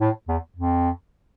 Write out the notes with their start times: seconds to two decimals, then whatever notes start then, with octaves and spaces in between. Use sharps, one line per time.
0.01 A2
0.28 E2
0.56 F2